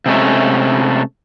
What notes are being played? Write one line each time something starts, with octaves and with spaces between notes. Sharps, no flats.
C3 G#3 A3 C#4